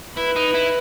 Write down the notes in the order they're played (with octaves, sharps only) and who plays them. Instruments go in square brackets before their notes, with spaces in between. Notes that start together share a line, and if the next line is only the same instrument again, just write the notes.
[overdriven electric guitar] E4 [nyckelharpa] B4
[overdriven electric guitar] D#4
E4